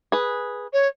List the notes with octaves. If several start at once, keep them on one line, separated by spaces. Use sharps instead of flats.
G#4 B4
C#5